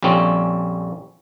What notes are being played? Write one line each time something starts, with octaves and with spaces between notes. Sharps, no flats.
A#1 F2 G3 C4 C#4